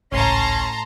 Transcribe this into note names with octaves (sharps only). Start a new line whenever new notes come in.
G#1 C#2 A2 C#4 A5 A#5 C6